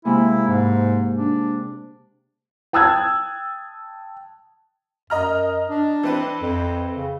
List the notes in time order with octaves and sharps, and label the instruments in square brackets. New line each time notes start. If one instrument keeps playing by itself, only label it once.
[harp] C3 G#3 A#3 [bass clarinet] E4
[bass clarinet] G#2
D4
[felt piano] G5 A5 D#6 E6 F#6 G#6
[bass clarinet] F#2 [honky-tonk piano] D#5 A#5 F6
[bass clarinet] D4
[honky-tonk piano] E3 C4 B4
[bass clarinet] F2
C#3